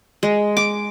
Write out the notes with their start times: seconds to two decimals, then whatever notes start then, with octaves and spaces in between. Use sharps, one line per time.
0.23 G#3
0.57 D6